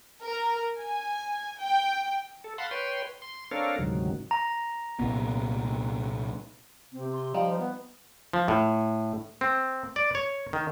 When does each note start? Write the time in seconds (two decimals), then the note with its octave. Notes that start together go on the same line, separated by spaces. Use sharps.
0.23 A#4
0.77 G#5
1.59 G5
2.44 A4
2.58 F5 F#5 A5 B5 C6
2.71 B4 C#5 G5 C6
3.22 C6
3.51 C4 D4 A4 A#4 C#5 F5
3.79 D2 G#2 C3 D#3 F#3
4.31 A#5
5.00 C2 A#2 B3
6.92 C3 C4
7.12 C6
7.34 F3 G3 D#4 F4
7.47 C5
7.59 B3 B4
8.33 F3
8.48 A2
9.41 C4
9.96 D5
10.15 C#5
10.53 D#3